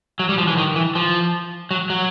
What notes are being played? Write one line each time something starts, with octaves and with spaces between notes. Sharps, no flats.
F#3
G3
F3
E3
D#3
E3
F3
F#3
F#3